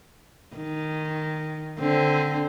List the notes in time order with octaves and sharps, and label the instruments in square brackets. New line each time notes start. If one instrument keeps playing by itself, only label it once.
[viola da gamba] D#3
D3 C4